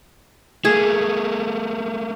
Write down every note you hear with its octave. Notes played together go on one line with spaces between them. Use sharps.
A3 A#3 G#4